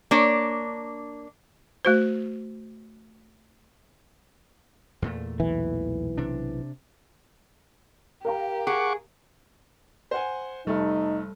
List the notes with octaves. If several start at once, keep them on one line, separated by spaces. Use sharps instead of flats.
A#3 D4 C#5
A3 F#4 C5
E2 A#2 A3
B1 E3
C3 D4
G4 A#4 F5 A#5
G#4 F#5 C#6 D6
C5 F#5 G#5
F1 G3 A3 D#4 A4